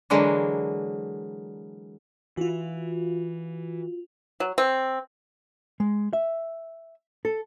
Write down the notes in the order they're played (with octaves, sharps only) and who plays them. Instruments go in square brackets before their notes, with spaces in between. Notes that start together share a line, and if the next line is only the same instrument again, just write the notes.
[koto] D3 E3 F#3 G#3 A#3 D4
[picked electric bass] E3 [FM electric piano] F4 F#4
[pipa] F#3
C4
[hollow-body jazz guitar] G#3
E5
A4